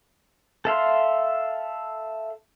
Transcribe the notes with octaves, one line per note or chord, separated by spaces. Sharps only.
A4 E5 F5 C6